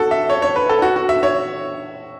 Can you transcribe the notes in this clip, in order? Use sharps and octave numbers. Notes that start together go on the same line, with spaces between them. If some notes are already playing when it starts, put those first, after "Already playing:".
Already playing: F#4 A4
E5
C#5
C#5
B4
A4
F#4
F#4
E5
C#5